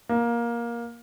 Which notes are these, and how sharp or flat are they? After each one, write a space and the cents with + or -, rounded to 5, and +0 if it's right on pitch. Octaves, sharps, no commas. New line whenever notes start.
A#3 +15